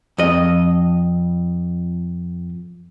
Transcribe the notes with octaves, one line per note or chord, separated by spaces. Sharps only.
F2 D#5